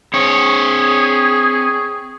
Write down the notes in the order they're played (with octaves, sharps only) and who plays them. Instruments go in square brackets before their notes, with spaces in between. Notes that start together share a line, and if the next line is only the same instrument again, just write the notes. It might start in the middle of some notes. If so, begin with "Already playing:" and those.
[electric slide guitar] C4 C#5 [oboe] G#4